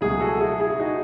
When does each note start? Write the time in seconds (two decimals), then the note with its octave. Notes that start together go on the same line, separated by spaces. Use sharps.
0.01 C#2 B2 F#3 A3 E4 G#4
0.20 F#4 A4
0.40 E4 G#4
0.60 E4 G#4
0.80 D#4 F#4